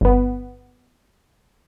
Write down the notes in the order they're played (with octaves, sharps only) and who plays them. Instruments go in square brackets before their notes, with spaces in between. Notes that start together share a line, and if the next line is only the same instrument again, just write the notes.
[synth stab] G1 B3